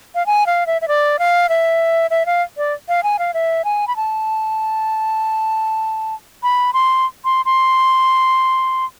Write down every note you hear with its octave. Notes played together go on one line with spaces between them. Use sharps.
F5
G#5
F5
E5
E5
D5
F5
E5
E5
F5
D5
F5
G#5
F5
E5
G#5
B5
A5
B5
C6
C6
C6